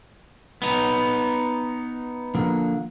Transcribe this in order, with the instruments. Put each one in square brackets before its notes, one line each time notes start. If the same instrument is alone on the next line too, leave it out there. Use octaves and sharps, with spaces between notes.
[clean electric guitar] B3 D#4
[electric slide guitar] D3 F3 A#3